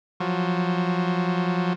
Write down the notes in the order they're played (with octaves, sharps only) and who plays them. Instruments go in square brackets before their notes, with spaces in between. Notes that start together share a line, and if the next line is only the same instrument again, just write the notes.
[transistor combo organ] F3 F#3